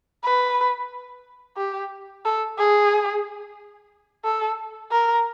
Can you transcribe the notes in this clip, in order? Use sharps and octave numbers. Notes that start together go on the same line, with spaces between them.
B4
G4
A4
G#4
A4
A#4